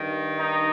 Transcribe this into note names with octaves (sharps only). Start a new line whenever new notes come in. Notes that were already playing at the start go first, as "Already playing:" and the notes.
Already playing: G2 D#3
D#4